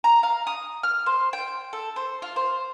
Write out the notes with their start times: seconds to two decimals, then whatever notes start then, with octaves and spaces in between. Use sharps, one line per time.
0.04 A#5
0.23 F5
0.47 D#6
0.83 F6
1.06 C5
1.33 G5
1.73 A4
1.96 C5
2.22 F4
2.36 C5